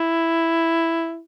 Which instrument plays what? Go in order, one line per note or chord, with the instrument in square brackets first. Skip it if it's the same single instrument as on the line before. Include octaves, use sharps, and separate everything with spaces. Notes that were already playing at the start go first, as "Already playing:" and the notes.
Already playing: [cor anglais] E4